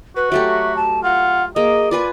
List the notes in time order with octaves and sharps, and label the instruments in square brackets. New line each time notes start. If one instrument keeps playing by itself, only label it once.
[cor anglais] F#4 [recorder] B4
[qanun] F#3 A3 G4 [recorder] E5
[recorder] A5
[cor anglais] F4 [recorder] F#5
[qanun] A#3 [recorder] G#4 [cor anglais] D#5
[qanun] F4 B4 G#5 [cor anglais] D5